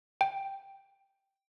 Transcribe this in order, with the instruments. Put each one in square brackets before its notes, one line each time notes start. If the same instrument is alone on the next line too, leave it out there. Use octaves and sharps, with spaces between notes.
[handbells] G5